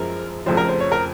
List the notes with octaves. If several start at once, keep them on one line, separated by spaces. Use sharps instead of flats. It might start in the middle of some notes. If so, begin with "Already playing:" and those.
Already playing: F#1 F#2 F3 G#3 A#4
F1 F2 C#3 F3 C5
A#4
C5
C#5
A#4